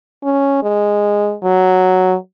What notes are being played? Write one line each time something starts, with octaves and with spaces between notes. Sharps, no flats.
C#4
G#3
F#3